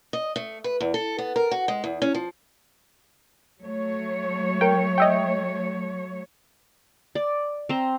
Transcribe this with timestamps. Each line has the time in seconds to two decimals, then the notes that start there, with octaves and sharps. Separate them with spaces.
0.13 D#5
0.36 A3
0.64 B4
0.81 E2
0.94 A4
1.18 B3
1.36 A#4
1.51 F#4
1.68 G#3
1.84 E2
2.02 C#4
2.14 F3
3.61 F#3 A3 C#5
4.61 A#4 G5
4.98 D#5 E5 G5
7.15 D5
7.69 C4 A#5